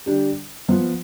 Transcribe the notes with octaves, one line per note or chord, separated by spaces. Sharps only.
D3 G3 D4 G4
F3 B3 F4